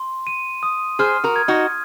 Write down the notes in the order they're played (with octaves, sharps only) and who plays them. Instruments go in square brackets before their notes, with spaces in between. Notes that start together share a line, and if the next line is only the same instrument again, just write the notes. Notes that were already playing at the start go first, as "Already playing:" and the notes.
Already playing: [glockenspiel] C6
D#7
D#6
[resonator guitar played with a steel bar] G#4 C5 [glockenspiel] F6
[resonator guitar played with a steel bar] F#4 A#4
[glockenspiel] G#6
[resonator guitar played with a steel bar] D#4 F#4